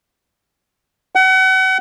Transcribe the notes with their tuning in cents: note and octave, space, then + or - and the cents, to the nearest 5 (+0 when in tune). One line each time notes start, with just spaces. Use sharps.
F#5 +35